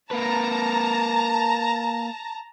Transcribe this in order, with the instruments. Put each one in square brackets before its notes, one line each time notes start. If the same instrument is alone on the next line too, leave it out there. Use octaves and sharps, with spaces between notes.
[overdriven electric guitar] A#3 B4 [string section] A5 A#5